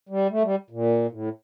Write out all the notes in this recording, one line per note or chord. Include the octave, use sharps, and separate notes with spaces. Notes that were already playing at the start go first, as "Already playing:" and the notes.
G3
A3
G3
A#2
A2